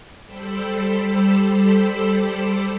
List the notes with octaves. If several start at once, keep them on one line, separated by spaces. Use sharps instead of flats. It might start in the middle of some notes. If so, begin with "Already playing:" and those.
G3 G4 A4 C5 B5 E6